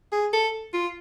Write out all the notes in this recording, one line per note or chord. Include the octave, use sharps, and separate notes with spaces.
G#4
A4
F4